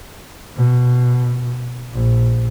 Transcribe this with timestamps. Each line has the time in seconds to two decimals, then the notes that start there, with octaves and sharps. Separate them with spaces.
0.56 B2
1.92 A#1